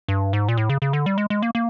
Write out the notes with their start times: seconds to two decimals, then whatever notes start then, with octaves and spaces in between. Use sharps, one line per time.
0.08 G2
0.33 G#2
0.49 A#2
0.57 A2
0.70 C#3
0.82 C#3
0.93 D3
1.06 G3
1.18 G#3
1.30 G#3
1.43 A#3
1.55 A#3